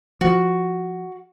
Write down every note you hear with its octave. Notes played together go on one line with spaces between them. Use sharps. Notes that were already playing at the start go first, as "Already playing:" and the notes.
F3 F#4